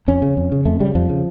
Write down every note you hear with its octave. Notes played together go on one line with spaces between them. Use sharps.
F2 C#4
C#3
F2
C#3
F2 A3
C#3 G3
F2 F3
C#3